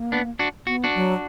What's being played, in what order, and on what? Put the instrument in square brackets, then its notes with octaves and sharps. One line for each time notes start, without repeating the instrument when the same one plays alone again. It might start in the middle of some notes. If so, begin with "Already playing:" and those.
Already playing: [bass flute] A#3
[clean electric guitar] B3 D4
D4 F#4
[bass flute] B3 [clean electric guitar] F#4
[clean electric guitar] D4 F#4
[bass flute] F#3